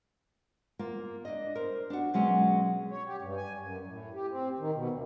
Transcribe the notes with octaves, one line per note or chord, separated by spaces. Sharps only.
A#3 F4
D4 D#5
A#4 C5
D4 F#4
B2 F#3 G#3 C#4
C#5
G4
G2
G#5
F#2
A2
G4
C4
D#3
B2
D2